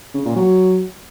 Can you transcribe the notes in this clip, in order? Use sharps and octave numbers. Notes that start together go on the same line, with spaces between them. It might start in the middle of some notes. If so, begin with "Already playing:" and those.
C#3
A#2
F#3